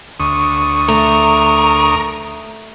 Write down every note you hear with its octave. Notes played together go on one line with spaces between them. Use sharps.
D2 C#6 D#6
A3 A#4